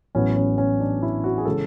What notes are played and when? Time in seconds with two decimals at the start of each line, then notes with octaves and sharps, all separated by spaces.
0.15 A1 A2 F#3 B3 C#4
0.36 C#4
0.58 C#4
0.80 D4
1.02 E4
1.24 F#4
1.38 G#4
1.45 C#3 E3 G#3 A4